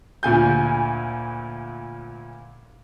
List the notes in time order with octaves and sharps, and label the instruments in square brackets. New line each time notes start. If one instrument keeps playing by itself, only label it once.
[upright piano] D2 A#2 G#5 G6